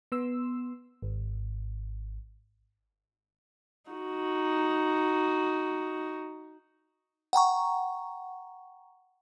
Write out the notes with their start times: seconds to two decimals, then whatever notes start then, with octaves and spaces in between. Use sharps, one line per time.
0.12 B3 C6 E6
1.02 G#1
3.90 D#4 F#4
7.33 F#5 G5 A#5 C#6